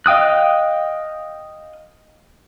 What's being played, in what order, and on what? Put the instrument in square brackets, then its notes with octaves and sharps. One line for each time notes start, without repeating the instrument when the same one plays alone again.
[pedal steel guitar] D#5 F5 G5 D#6 F#6